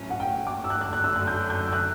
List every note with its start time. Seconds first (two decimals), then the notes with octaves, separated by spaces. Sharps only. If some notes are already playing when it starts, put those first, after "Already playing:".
Already playing: A2 F#3 C#4
0.10 F#5
0.20 G5
0.47 D6
0.64 E6
0.70 F#6
0.81 F#2 D3 F#3 F#6
0.93 F#6
1.04 E6
1.16 F#6
1.27 G6
1.50 G6
1.68 E6
1.73 F#6